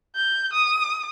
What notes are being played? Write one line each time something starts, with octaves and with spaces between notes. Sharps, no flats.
G6
D#6